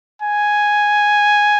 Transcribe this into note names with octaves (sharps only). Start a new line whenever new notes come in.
G#5